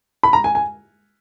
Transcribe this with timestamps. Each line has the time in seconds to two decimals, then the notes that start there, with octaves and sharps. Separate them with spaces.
0.23 B5
0.33 A#5
0.44 G#5
0.55 G#5